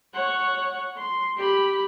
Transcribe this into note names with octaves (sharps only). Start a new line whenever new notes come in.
C#5 F#5
C6
G4 B5